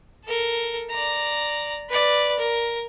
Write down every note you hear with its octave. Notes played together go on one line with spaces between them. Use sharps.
A4 A#4
D5 A#5
B4 D5
A#4